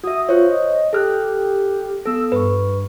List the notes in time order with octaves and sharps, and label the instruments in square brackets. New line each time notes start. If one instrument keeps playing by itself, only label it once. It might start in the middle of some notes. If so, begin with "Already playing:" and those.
[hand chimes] F#4 E5 [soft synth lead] D#6
[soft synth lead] F4 [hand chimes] C5 C#5
[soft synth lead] D#5
[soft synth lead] G4 [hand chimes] A4 F6 F#6
[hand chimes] B3 A4 [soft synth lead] E6
[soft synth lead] G2 [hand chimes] B4 C#6